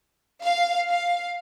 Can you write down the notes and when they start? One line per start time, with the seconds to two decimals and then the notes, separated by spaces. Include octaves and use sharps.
0.43 F5
0.89 F5